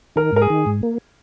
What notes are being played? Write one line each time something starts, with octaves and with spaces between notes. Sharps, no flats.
D#3 A#4
G#2 A#4
G#4
D#3
G#2
A#3